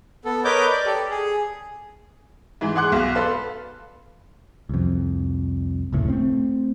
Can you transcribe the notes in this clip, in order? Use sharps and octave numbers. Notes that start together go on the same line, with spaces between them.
B3 A4
A#4 B4 C#5 D#5 D6 G6
D5
G4 A4
G#4
G#2 E3
G#4 F#5 C6 D6 F#6
B1
A4 B4 F5 C6
C2 F2
F1 C#2 A2
A3 C4